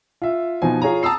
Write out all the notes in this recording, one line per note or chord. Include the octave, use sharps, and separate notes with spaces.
F4 E5
B2 F3 D#4 C5 G#5
F4 G#4 C#5 G#5 A#5
A5 A#5 D#6 E6 C7